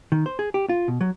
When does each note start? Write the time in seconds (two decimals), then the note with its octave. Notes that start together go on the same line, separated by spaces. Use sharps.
0.12 D#3
0.26 C5
0.39 G#4
0.54 G4
0.69 F4
0.88 B2
1.01 F#3